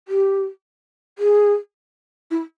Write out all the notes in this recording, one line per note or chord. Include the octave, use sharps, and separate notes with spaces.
G4
G#4
E4